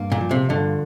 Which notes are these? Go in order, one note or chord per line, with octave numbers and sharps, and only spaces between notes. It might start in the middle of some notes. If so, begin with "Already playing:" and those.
Already playing: G2 A#3
A#2
F3
C3
G2 D3